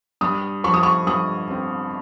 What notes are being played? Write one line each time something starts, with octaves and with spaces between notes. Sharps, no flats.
G2 D#6
F3 C#6
D#6
C#6
G2 D#6
C4